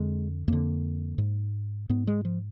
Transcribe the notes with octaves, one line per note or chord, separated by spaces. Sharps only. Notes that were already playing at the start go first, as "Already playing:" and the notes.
Already playing: F2 D3 G#3
F2 D3 A#3
G#2
G#2 B3
G#3
F3